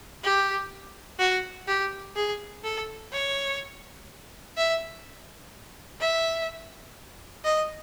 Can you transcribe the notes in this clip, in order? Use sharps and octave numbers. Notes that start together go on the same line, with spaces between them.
G4
F#4
G4
G#4
A4
C#5
E5
E5
D#5